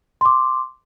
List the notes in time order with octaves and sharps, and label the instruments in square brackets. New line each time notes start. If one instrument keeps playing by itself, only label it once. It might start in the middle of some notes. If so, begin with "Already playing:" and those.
[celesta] C6 D6